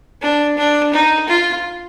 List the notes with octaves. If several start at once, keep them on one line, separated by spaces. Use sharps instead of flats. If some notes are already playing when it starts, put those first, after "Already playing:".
D4
D4
D#4
F4